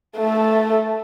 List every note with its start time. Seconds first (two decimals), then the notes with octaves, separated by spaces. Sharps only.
0.17 A3 A4